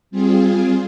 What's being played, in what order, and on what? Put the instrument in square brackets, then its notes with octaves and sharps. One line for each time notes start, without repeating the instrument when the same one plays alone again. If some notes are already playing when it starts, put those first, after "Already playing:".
[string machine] G3 C4 F4 G#4